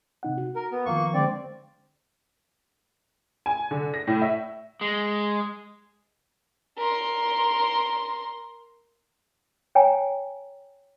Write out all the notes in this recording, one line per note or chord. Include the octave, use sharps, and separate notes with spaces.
C3 D#4 F#5
F#4
A#4
B3
F2 D#3 F3 A#3 C#6
D3 G#3 C4 D5
G#5
D3
A#6
A2
E5
G#3
A#4 C6
C#5 G5 G#5 A#5